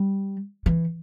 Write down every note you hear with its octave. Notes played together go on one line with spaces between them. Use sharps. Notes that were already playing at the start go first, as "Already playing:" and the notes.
Already playing: G3
E3